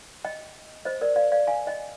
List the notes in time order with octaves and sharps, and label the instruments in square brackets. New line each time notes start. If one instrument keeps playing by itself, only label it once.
[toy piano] D#5 G5
C5 D#5
A#4 D5
D5 F5
D5 F5
F5 G#5
D#5 G5